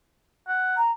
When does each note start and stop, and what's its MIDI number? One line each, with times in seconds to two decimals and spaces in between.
0.48 0.77 78
0.77 0.91 82